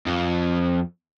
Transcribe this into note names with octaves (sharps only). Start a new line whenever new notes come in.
F2